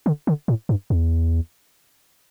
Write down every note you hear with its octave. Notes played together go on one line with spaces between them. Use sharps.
D3
D3
A2
G2
E2